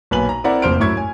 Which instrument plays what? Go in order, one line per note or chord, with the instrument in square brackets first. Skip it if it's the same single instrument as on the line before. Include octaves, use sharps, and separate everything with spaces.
[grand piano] B1 A#2 B4 G#5 F#7
A#5
C4 E4 A#4 D5 F#5 A#5
F1 F2 A#2 C5 F6 D7
F#2 A2 E4 C#6 G#6
G#5